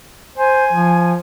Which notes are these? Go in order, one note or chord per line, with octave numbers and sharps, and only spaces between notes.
C5 G#5
F3